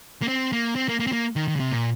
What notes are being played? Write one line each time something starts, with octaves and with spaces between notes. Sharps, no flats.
A#3
C4
A#3
C4
A#3
A#3
C4
A#3
D#3
D#3
C#3
C3
A#2